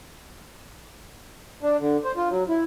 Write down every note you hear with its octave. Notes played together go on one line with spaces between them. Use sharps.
D4
D3
C5
F4
F#3
E4